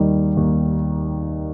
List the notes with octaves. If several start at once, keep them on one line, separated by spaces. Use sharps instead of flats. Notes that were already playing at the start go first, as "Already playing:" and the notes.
Already playing: D#2 D#3 G3
D#2